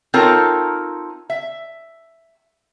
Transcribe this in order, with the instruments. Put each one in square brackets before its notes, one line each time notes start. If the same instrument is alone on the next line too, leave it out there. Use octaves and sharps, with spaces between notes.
[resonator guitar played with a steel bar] C4 D#4 F4 A4 A#4 C#5
E5